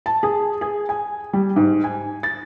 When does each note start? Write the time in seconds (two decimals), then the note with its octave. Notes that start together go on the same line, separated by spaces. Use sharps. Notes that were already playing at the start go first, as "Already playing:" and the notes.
0.06 A5
0.23 G#4
0.61 G#4
0.89 G#5
1.33 G3
1.56 G#2
1.84 G#5
2.23 A6